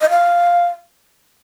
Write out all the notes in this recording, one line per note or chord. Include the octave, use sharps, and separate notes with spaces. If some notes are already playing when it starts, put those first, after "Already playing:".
D#5
F5